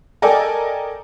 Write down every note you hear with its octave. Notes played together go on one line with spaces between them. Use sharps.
A4 A#4 D5 D#5 G5 G#5